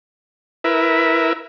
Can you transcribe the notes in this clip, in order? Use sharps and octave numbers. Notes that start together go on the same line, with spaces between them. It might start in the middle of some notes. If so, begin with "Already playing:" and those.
E4 A#4 B4 E5